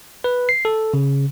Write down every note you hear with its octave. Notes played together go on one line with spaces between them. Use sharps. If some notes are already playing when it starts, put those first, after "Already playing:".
B4
C7
A4
C#3